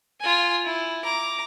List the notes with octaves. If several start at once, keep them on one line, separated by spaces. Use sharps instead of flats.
F4 G#5
E4
A#5 D6